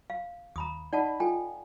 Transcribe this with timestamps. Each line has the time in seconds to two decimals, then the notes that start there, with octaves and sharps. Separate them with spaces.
0.10 F5
0.56 D#2 A#5 B5 D#6
0.93 D#4 D5 D#5 F#5 A5 B5
1.20 F4 A4 G5 G#5